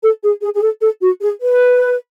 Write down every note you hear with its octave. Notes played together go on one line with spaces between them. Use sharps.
A4
G#4
G#4
G#4
A4
A4
F#4
G#4
B4